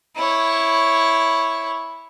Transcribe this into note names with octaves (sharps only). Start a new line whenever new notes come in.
E4 C#5